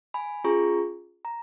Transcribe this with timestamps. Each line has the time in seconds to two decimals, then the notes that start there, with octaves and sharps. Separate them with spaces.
0.14 G#5 B5
0.44 C#4 F4 G#4 A#5 C#6
1.25 A#5